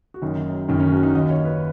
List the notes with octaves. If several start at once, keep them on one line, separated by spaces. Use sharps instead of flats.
F#4
F#1 F#2 D#3 D#4
F#1 F#2 D#3 C#4
C#4
F#4
D#4
D#2 D#3 D#5
C#5
B4